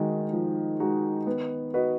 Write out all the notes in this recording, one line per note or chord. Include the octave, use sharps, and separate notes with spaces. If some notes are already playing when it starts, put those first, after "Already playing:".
Already playing: D#3 G#3 D#4 F#4
F3
G#3 D#4 F#4
B3
F#4 B4 D#5